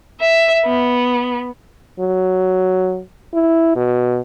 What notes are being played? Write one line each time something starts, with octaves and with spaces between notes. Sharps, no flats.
E5
B3
F#3
E4
B2